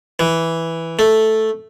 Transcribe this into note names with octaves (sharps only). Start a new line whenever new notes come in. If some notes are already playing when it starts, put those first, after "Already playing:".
E3
A3